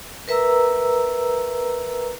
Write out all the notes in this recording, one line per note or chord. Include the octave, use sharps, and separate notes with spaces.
A#4 B4 E5 A#5 E6